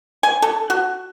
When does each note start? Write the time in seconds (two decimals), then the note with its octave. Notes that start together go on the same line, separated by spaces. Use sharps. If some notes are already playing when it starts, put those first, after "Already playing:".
0.23 G#5
0.42 A4
0.70 F#4